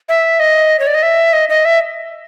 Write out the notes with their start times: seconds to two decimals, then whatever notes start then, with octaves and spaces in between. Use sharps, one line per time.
0.09 E5
0.40 D#5
0.79 C#5
0.87 D5
0.94 D#5
1.03 E5
1.33 D#5
1.49 D#5
1.65 E5